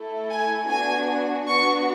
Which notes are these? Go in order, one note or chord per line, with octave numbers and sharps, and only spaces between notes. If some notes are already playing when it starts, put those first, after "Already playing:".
Already playing: A3 E4 A4
G#5
B3 D4 F#4 G#5
B3 D4 F#4 C#6